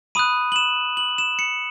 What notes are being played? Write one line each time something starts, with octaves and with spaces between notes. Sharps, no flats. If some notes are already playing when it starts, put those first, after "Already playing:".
B5 D#6 F#6 D#7
F#7
E7
F#7
E7
C#7